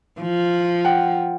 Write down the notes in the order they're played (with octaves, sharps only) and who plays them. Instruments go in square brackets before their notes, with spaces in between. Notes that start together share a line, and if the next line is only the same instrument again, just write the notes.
[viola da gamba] F3
[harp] F#5 G5